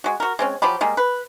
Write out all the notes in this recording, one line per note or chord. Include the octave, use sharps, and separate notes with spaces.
G#3 F#4
F#4 A#4
G#3 C4 C#4
F3 F#3 G4 B5
G3 G#3 A#3
B4